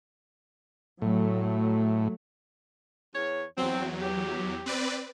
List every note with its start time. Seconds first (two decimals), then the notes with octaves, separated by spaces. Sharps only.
1.02 A2 F#3 A3
3.15 E2 C#5
3.58 E2 F#3 C4
4.02 G4
4.66 C4 B4 D5